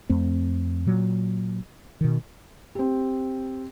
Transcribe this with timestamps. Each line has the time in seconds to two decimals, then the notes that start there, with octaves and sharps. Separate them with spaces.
0.09 F2 A3 C4
0.86 A#2 F#3
2.01 B2 D#3
2.75 C4 G4